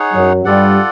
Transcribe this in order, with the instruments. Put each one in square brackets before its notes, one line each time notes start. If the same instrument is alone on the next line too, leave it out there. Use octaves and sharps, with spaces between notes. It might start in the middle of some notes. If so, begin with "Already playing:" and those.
Already playing: [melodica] D#4 G#4 C#5 F#5
[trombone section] F#2 F#3
[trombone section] G2 G3 [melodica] F4 A4 D5 F#5